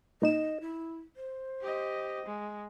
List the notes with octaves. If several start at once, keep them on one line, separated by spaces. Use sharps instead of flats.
A#2 D#4 D#5 E7
E4
C5
G4 D#5
G#3